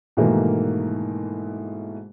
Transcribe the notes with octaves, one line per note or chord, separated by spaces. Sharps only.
G#2 B2 D#3 E3 A3 A#3